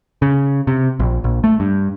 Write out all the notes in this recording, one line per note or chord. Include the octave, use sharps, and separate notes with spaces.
C#3
C3
A#1
A#1
A3
G2